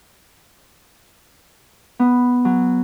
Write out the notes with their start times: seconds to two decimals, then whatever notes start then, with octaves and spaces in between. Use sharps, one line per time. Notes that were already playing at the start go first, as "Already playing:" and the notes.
1.99 B3
2.45 F#3